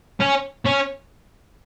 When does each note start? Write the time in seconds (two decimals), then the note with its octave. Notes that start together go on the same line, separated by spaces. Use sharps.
0.21 C#4
0.65 C#4